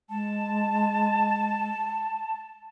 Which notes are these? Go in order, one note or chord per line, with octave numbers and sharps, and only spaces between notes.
G#3 A5